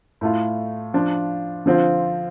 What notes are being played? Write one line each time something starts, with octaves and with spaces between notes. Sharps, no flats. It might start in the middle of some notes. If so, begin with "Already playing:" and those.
A2 A3 F4
F3 D4 F4
D3 F3 C4 F4